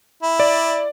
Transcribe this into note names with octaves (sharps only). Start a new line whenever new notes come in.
E4
D5